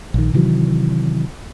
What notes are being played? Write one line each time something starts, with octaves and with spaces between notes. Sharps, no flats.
A#1 D#3
C3 D#3 E3 F#3